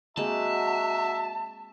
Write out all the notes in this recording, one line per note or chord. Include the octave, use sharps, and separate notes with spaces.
G#3 A#3 C4 F#4 E5 A5 A#5